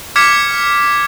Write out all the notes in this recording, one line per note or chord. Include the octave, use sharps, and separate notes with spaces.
D6 F6 G#6 B6 C#7